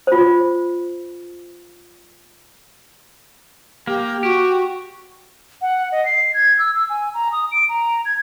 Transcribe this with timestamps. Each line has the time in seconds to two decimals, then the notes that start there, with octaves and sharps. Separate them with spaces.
0.07 F4 C5
3.87 A#3 G4
4.23 F#4 G4
5.62 F#5
5.92 D#5
6.05 C7
6.34 G#6
6.59 E6
6.75 E6
6.90 G#5
7.14 A#5
7.32 D#6
7.52 D7
7.69 A#5
8.05 G#6